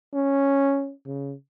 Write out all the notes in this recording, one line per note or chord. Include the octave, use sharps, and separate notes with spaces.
C#4
C#3